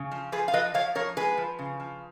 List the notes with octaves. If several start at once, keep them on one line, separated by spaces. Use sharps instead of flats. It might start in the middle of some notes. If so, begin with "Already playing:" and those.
Already playing: C#3
F3
F3 G#4 B4
F5
F3 B4 D#5
F3 C#5 F5
F3 A#4 C#5
G#3 G#4 B4
F3
C#3
F3